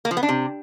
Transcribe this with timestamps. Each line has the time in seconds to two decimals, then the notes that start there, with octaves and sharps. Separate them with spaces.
0.05 A#3
0.11 F3
0.17 B3
0.23 D4
0.29 C3